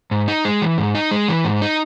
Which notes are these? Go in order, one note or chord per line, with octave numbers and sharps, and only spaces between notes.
G#2
D#4
G#3
E3
G#2
D#4
G#3
E3
G#2
D#4